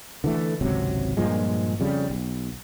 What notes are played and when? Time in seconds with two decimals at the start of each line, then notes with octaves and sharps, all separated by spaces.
0.24 D3 E3 A3
0.61 G#1 C#2 C3 F#3
1.17 G2 A#2 F3 G#3
1.80 F2 C#3 G3
2.10 B1